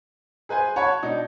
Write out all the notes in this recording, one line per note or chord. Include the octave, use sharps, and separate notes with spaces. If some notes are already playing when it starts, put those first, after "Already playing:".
G#4 B4 C5 G#5
C#5 F#5 A5 B5 C#6 G#6
B2 D4 D#4